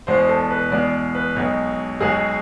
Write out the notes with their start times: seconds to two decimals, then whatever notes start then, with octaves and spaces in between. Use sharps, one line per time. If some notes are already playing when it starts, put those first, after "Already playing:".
0.07 E2 B2 G#3 C5
0.29 A4
0.50 B4
0.71 E2 B2 G#3 D5
1.15 B4
1.36 B1 B2 G#3
2.00 B1 B2 G#3 G#4